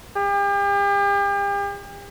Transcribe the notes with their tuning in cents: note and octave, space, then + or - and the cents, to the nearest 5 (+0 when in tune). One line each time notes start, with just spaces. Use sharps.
G4 +40